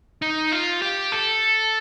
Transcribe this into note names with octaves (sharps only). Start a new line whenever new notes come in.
D#4
F4
G4
A4